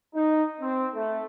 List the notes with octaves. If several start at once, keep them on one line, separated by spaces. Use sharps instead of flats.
D#4
C4
A3